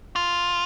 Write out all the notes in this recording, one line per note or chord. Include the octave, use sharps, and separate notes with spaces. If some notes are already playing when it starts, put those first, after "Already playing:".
F4